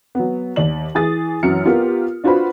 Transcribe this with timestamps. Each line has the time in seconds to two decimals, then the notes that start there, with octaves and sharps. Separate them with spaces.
0.15 F#3 B3
0.56 D#2 D5 F#7
0.95 E3 G#4 D#6 A6
1.43 F#2 E3 F#3 E4 F6 C#7
1.66 B3 F4 G4 A#4
2.24 D4 F4 F#4 B4 C5 B5